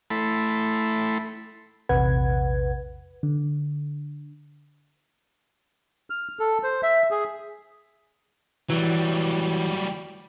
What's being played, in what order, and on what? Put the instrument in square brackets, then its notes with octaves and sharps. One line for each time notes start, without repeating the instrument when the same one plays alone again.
[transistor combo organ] A3 E4 A4 B5 C6
[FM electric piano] A#1 E2 C3 B4 F#5 G#6
D3
[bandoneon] F6
A4
C5
E5
G#4
[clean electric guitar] E3 [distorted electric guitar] F#3 G3